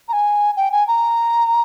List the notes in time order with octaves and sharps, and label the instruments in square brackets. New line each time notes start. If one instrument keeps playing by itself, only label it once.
[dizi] A#5
G#5
G5
G#5
A#5